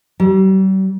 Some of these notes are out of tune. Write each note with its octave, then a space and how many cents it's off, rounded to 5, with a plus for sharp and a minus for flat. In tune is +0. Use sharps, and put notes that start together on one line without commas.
G3 -45